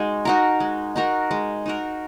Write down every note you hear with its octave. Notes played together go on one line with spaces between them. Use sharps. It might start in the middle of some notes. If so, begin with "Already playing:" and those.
Already playing: G#3 D#4 F#4
D#4 F#4 A#4
G#3
D#4 F#4 A#4
G#3
D#4 F#4 A#4